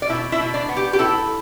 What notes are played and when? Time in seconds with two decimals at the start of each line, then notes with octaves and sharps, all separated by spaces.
0.02 D5
0.09 B2 E4 E5
0.32 E4 E5
0.40 B2
0.54 D4 D5
0.69 B3
0.77 G4
0.93 G4
0.99 E4 A4